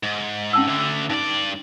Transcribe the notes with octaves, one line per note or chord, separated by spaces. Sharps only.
G#2
C#4 A5 E6
D2 D3
G2 D#4 D5